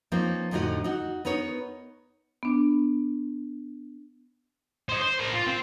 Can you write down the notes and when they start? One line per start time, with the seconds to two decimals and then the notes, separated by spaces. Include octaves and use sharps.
0.12 F3 A#3 C4 C#4 D#4
0.51 F2 A2 D3 D#4 F#4 D#5
0.84 D#4 F#4
1.25 B3 D#4 A#4 C#5
2.43 B3 D4
4.89 C5 D#5
5.02 C5
5.19 A#4 C5
5.33 F4
5.46 C4